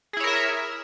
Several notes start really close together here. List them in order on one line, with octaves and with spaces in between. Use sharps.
G#4 E4 C#5 A#4 E5